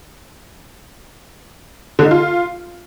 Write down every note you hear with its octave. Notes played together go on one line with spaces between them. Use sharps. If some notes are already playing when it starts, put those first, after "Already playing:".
D3
D#4
F4